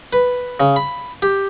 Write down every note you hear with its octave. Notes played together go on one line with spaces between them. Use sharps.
B4
C#3
B5
G4